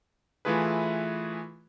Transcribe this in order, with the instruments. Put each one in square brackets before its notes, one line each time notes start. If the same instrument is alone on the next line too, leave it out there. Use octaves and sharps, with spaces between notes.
[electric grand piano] E3 A3 E4 F4 G#4 B4